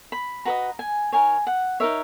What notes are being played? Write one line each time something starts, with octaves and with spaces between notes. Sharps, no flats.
B5
F#4 B4 D#5 A#5
G#5
D#4 A#4 C#5 G#5
F#5
D#4 A#4 C#5 E5